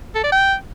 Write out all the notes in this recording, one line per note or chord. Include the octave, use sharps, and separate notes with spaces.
A4
D5
G5